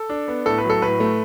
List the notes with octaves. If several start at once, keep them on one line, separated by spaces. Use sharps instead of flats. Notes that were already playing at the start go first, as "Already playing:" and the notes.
Already playing: A4
D4
B3
A2 A4
B4
F#3
A4
A2 B4
A3